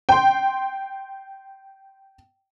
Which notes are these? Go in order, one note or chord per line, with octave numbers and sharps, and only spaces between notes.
G5 C6